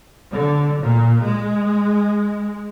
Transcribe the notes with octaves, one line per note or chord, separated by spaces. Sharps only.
D3
A#2
G#3